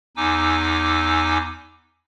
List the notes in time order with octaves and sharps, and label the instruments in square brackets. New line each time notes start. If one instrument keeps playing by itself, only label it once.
[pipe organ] E2 D#4 G#5 D6 E6